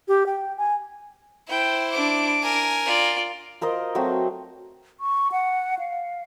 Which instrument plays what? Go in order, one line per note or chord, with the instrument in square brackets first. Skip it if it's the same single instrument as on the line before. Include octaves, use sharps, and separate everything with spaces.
[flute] G4
G5
G#5
[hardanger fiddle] E4 C5 [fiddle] G5
[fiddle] D4 D6
[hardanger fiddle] A#4 G#5
[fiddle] F4 D5
[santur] F4 A#4 C5 D#5
F#3 A3 C4 F#4
[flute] C#6
F#5
F5